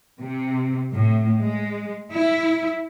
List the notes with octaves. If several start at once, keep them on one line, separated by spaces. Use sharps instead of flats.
C3
A2
G#3
E4